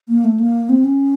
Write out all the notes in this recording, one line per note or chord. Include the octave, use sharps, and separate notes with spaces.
A#3
A3
A#3
C4
C#4